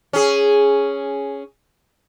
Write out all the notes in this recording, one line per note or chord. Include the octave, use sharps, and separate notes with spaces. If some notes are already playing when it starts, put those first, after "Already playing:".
C#4 G#4